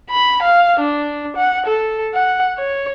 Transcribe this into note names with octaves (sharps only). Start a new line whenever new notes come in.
B5
F5
D4
F#5
A4
F#5
C#5